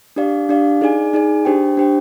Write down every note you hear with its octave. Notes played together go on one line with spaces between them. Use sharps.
D4 G4 D5 F5
D4 G4 D5 F5
D#4 G#4 D5 G#5
D#4 G#4 D5 G#5
D4 G4 C5 G5
D4 G4 C5 G5